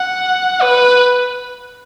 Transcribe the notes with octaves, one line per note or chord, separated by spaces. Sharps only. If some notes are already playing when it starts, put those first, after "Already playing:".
Already playing: F#5
B4